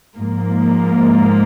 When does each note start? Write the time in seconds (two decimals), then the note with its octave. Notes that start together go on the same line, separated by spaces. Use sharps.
0.17 G#2 F3 A#3